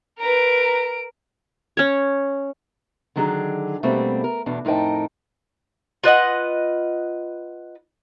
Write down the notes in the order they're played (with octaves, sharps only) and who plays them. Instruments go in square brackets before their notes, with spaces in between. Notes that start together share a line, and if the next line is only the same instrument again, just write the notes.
[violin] A#4 D7 [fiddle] B4 A#5
[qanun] C#4 C#5
[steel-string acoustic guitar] D3 D#3 F#3 D4 G#4
B2 G3 A3 A#3 C4 D4
A#4
E2 B2 D4
F2 A2 D#4 A#4 G5 A5
[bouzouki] F4 B4 D#5 F#5